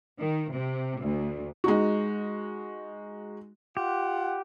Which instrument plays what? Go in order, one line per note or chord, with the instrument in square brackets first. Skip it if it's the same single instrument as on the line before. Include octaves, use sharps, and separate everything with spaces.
[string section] D#3
C3
D2
[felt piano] G#3 D#4 F#4
[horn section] F4 F#5 [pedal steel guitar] G4